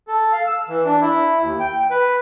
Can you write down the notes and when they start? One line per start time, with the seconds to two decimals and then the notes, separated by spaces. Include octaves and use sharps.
0.08 A4
0.33 F5
0.47 E6
0.69 E3
0.85 D4
1.01 E4
1.41 D#2
1.60 G5
1.91 B4